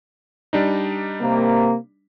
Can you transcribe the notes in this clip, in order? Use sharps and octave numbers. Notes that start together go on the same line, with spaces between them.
G3 D4 D#4
C3 A#3